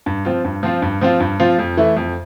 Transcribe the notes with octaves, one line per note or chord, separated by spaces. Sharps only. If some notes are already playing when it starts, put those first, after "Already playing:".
G2
F3 C4 F4
G2
F3 C4 F4
G2
F3 C4 F4
G2
F3 C4 F4
F2
E3 A3 E4
F2